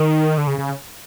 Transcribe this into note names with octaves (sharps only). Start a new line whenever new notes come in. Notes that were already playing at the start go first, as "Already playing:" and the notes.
Already playing: D#3
D3
C#3
C#3